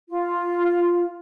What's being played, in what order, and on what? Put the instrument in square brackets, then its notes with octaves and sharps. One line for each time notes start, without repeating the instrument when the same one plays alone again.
[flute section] F4